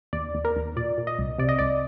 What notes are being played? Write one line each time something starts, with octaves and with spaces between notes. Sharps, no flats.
D#2 D5
D#2
A#4
D#2
A#2 D5
A#2
D#5
C2
C3 D5
D#5
C2 D5